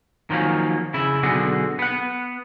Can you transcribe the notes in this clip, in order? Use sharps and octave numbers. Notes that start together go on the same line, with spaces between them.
D#3 F3 F#3 A#3 C#4
C#3 E4
B1 D3 F#4 G#4
B3 F#5